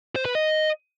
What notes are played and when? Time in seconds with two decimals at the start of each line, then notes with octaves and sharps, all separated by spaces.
0.16 C5
0.25 B4
0.35 D#5